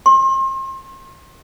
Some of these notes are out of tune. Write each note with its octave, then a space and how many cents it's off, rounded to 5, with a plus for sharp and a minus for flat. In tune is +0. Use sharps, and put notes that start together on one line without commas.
C6 +35